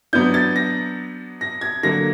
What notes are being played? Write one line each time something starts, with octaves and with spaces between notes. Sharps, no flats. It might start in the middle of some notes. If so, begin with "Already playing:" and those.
F#3 B3 D4 G6
A6
A#6
A#6
G#6
D3 F#3 A#3 A#6